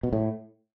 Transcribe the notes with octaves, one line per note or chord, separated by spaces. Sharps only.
B2
A2